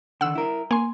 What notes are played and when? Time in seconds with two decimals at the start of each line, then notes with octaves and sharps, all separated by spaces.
0.21 D3 D#3 F#5 E6
0.35 E4 A#4
0.71 A#3 G#5 C6